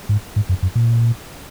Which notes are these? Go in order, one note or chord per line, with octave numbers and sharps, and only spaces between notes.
G#2
G#2
F#2
F#2
A#2